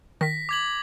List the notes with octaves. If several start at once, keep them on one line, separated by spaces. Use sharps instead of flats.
D#3 A#6 B6
D6 G#6 F#7